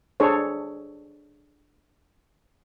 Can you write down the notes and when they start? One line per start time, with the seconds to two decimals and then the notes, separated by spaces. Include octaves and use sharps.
0.20 D4 G#4 A4 C5 C#5